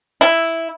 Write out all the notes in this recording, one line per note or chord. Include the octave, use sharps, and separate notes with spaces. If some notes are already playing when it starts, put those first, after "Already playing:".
E4